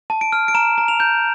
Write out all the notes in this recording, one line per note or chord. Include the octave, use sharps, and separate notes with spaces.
A5
D7
F6
D7
A#5 E7
A#5
F7
G6